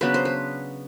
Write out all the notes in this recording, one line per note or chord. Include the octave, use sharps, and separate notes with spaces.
C#3 F#3 B3 D4 B4
C5
B4